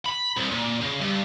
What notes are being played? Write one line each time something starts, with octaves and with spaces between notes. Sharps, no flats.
B5
C2
A#2
C#3
G2